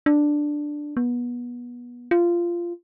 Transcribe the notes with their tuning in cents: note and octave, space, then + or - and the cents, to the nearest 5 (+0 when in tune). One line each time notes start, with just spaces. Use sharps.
D4 +5
B3 -25
F4 -15